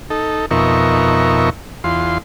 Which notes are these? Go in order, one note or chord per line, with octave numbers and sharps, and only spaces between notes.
D#4 A4
F2 B2 D#4 A#4 E5 C#6
E2 F4 C6